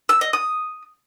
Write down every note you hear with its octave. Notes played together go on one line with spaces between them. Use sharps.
E6
D#5
D#6